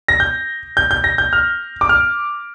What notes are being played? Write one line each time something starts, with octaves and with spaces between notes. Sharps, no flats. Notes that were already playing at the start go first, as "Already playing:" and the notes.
A#6
G6
G6
G6
A#6
G6
F6
D6
F6